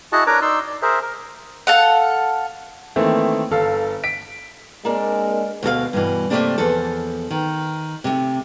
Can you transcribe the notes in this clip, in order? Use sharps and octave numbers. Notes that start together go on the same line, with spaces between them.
E4 F#4 G#4 D#5 F#5 A5
D4 A#4 B4 C#5 A#5 D6
D#4 D5 C6 E6
D5
G#4 A#4 C5 E5
A#4
A4 F5 F#5
D#3 E3 A3 A#3 C4
G1 A4 F5
B6 D7
G#3 A#3 C4 D4 A#4
D2 B2 A4 F5
G2 B2 E3
C3 D#3 A3 A#3 C4 D4
E2 F3 A4
D#3
C3 A3